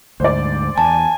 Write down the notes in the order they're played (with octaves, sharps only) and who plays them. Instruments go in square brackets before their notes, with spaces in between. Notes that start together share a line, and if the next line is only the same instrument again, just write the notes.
[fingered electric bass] D2 G#2 [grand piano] C5 D5
[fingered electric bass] E2 [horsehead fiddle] G#5 [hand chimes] A5